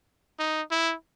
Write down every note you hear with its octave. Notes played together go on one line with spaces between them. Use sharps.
D#4
E4